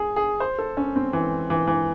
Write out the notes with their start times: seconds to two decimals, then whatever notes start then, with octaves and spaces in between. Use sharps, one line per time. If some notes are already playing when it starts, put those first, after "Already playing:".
Already playing: G#4
0.16 G#4
0.40 C5
0.59 A4
0.77 C#4
0.96 C4
1.13 E3
1.50 E3
1.67 E3